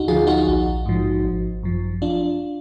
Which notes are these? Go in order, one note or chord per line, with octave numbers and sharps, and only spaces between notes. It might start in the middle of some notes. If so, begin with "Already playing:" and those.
Already playing: D2 D#4 F#4
D3 F3 F4 G#4
D#4 F#4
A#1
G#2 F3
G#1
F#2 F3
D4 F4